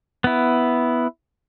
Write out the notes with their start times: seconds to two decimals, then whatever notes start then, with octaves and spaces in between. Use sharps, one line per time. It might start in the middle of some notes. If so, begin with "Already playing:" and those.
0.24 B3 E4